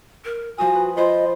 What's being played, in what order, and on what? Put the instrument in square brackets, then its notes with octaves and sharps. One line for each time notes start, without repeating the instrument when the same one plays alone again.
[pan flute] A#4
[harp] F3 D#6 [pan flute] F#4 [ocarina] G#5
[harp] B4
[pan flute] F4 [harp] C5 B5 [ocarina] D#5